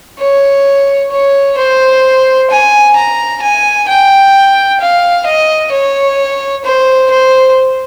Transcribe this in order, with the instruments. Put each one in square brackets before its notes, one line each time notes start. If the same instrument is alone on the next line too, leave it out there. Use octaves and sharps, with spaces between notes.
[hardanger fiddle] C#5
C#5
C5
G#5
A#5
G#5
G5
F5
D#5
C#5
C5
C5